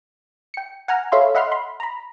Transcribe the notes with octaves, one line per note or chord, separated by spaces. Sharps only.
G5 C#7
F#5 G#5 A#5 F6
A4 C#5 E5 F5 B5 C6
D#5 E5 F#5 B5 C6 F6
B5 C6
A#5 B5